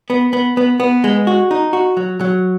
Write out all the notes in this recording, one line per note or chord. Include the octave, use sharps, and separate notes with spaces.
B3
B3
B3
B3
G#3
F#4
D#4
F#4
F#3
F#3